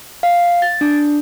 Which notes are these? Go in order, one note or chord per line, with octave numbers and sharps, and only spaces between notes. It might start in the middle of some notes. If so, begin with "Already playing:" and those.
F5
A6
D4